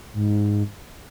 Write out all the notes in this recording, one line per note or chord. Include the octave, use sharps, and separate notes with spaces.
G#2